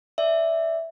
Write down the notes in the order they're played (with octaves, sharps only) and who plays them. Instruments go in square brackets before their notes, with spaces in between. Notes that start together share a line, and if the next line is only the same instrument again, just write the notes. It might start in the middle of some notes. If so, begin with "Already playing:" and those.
[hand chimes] D5 E5